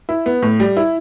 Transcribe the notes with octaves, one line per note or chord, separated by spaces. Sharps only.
E4
B3
A2
G3
E4